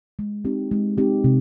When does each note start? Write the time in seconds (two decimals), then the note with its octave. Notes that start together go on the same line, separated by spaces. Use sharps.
0.19 G#3
0.45 C4 D#4 G4
0.71 G#3
0.98 C4 D#4 G4
1.24 C3